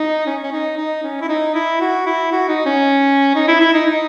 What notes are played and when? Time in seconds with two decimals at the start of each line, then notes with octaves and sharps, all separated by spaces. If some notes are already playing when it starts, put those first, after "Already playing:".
Already playing: D#4
0.27 C#4
0.43 C#4
0.52 D#4
0.77 D#4
1.03 C#4
1.21 E4
1.29 D#4
1.55 E4
1.81 F#4
2.06 E4
2.32 F#4
2.48 D#4
2.66 C#4
3.35 D#4
3.48 E4
3.61 E4
3.73 D#4
3.85 D#4